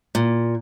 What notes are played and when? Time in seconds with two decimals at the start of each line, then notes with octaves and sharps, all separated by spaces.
0.15 A#2